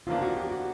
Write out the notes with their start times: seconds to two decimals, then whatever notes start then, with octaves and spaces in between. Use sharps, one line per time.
0.07 E2 C#3 F3 A#3 D4 F4
0.22 F#4
0.36 G4
0.52 F#4